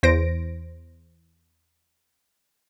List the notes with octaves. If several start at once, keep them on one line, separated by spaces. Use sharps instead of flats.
E2 C5 A#6 D7